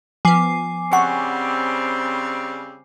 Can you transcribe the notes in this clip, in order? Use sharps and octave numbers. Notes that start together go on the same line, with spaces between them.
F3 B3 G#5 D6 C7
C#3 G3 C4 F#5 C#6